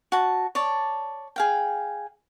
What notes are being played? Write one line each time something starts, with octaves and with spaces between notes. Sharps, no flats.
F#4 A5
C#5 D5 A5
G#4 F5 G5